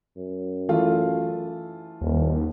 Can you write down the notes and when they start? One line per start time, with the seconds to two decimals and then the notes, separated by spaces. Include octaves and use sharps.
0.17 F#2
0.69 E3 A3 F4
2.01 D#1 D#2